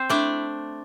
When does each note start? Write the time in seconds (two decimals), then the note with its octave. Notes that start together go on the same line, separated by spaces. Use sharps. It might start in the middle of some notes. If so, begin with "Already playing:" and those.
Already playing: C4 C5
0.10 A3 D4 E4 D5